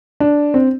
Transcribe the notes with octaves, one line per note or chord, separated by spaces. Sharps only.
D4
C4